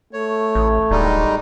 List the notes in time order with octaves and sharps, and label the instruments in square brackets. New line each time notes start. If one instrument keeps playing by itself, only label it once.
[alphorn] A3 [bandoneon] C#5
[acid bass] A1
[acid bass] D1 [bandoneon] G3 G#3 D#4